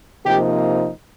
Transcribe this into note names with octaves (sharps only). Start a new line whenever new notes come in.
C3 F3 A#3 D#4 G4